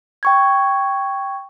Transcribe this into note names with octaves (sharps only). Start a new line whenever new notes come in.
G5 C#6 G#6